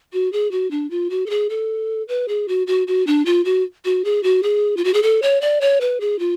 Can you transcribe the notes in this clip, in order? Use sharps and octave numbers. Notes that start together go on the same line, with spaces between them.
F#4
G#4
F#4
D4
F4
F#4
A4
G#4
A4
B4
G#4
F#4
F#4
F#4
D4
F4
F#4
F#4
G#4
F#4
G#4
F4
F#4
G#4
A4
C#5
D5
C#5
B4
G#4
F4